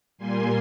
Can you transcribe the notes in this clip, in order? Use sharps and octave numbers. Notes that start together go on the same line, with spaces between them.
A#2 G3 A#3 G#5 C6